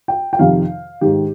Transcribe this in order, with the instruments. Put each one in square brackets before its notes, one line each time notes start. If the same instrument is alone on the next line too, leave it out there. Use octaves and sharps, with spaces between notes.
[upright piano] G5
G5
F2 C3 D#3 F5
G#2 D#3 G4